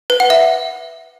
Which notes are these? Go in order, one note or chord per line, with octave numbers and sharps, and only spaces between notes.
B4
F#5
E5